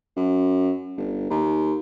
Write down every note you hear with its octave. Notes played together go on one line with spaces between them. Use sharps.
F#2
G1
D#2